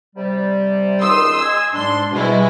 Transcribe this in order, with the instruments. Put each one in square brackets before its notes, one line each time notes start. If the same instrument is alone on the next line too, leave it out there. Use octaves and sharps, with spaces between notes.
[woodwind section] C3 G3
[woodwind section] C#2 D#3 D#6 [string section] C6 E6
[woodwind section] D#5 G#5
[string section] G#2 C6 [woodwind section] D4
[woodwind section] B2 [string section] G3 G#3 E4